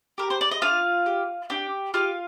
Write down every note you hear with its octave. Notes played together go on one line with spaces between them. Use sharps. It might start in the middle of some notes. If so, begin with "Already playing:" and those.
G4 A#4
C5
D5
D#5
D4 F4 F5
G4
D4 G4 G5
F4 G4 F5